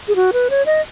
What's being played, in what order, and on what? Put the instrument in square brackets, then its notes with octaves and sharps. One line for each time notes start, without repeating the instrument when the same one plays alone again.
[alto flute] G#4
F#4
B4
C#5
D#5